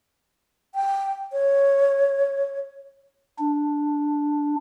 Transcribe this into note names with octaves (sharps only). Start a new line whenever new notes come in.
G5
C#5
D4